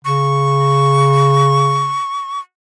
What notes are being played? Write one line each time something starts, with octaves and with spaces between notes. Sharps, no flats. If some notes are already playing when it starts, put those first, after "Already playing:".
C#3 C#6